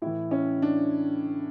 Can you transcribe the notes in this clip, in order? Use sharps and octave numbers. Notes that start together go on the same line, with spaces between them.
A2 E3 E4
C#4
D4